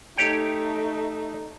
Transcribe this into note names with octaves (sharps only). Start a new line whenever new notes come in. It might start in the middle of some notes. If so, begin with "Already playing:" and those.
A3 D#4 G4 C#5 G5